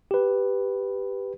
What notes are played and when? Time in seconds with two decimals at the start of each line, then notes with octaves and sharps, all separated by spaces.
0.11 G4 B4